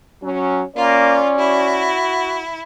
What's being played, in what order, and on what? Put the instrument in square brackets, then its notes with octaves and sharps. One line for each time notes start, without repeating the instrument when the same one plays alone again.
[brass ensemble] F#3 C#4
[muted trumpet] A#3 [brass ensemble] C#4 D5 [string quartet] F4
[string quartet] E4 [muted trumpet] F#4